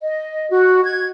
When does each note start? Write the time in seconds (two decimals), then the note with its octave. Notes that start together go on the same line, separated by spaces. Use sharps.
0.01 D#5
0.50 F#4
0.83 G#6